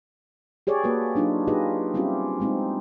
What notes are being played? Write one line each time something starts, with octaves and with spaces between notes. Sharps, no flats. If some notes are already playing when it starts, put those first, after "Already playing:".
G4 G#4 C#5 D5
A#3 F#4 A4 B4
F#3 D4 D#4 F4
D#4 F4 G4 G#4 B4 D#5
G3 C4 C#4 E4 F4 G4
G#3 C4 D#4